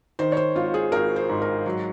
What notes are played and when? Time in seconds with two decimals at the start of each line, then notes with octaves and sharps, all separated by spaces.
0.19 D#3 C5
0.32 C#5
0.37 C5
0.55 G#1 F4
0.74 G#4
0.92 G#1 A#4
1.16 C5
1.29 G#2
1.42 A#4
1.66 F#3